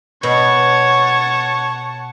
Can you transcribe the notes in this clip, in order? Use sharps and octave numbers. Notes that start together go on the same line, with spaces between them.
B2 C#5 F#5 A5